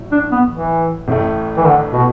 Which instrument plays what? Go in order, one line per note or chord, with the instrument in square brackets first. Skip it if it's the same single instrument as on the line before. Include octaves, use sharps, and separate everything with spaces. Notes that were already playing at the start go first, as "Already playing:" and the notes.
Already playing: [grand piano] A1 A2 F#3
[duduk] D4
B3
E3
[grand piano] A1 A2 A3
[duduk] E3
D3
B2